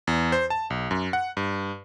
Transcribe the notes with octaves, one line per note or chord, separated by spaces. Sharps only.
E2
C5
A5
B1
F#2
F#5
G2